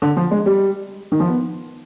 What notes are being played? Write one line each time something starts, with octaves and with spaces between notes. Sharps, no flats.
D3
F3
G#3
G3
D#3
F3
B3